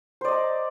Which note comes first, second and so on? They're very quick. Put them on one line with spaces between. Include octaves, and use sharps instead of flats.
C5 D5 D#5 A#5